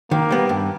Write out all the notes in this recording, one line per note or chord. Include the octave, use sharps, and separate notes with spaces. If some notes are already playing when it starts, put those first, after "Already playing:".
D#3 A#3
G3 B3
G2